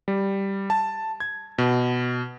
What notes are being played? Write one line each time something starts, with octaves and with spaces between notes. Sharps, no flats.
G3
A5
G#6
B2